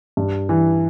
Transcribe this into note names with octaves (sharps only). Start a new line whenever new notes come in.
G2
E3